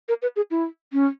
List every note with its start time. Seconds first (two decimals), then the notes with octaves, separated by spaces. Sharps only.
0.08 A#4
0.22 B4
0.36 G#4
0.51 E4
0.93 C#4